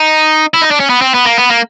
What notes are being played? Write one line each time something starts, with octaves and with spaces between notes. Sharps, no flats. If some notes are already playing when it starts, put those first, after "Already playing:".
Already playing: D#4
E4
D#4
D4
C#4
B3
C4
B3
A#3
B3
A#3